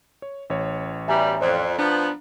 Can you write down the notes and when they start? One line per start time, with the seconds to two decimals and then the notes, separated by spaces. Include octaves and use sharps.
0.22 C#5
0.50 A1 C#5
1.08 B2 E3 G3 E5 G#5 A#5
1.41 F2 C5 D5
1.79 F3 B3 D4 A#5